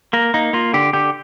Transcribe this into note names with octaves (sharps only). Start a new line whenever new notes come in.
A#3 A#4
A#3 D#4
A#3 F4
D3 G4
D3 G4